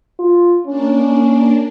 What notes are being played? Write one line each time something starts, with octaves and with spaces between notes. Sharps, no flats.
F4
A#3 C#4 D4